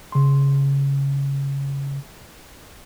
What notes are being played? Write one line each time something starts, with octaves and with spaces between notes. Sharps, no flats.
C#3 C6